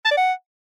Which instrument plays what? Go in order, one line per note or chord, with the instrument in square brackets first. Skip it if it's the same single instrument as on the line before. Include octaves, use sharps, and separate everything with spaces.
[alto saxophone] A5
D5
F#5